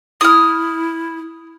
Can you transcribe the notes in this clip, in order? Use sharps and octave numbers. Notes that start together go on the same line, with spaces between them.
E4 D#6 F6